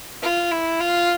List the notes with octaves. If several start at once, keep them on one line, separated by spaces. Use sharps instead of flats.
F4
E4
F4